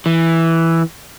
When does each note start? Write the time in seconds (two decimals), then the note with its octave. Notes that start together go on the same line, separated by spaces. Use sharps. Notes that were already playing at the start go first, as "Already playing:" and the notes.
0.06 E3